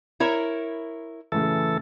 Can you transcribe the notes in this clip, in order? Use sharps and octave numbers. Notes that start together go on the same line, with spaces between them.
E4 A#4 C#5 B5
F#2 A2 C#3 E3 A4